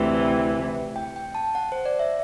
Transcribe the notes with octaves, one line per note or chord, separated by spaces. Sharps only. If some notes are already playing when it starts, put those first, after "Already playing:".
Already playing: D2 C3 E3
G5
G5
A5
F#5
C5
D5
E5